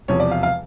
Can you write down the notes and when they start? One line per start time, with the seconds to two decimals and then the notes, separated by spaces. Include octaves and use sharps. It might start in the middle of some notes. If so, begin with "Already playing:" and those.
0.08 E1 E2 C3 F3 C#5
0.20 D5
0.31 F5
0.43 F5